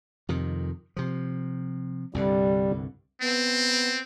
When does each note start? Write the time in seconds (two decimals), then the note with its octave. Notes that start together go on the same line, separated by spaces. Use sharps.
0.29 F2 C3 D#3
0.96 C3 F3
2.15 C2 G2 D3 G3
3.21 B3 C4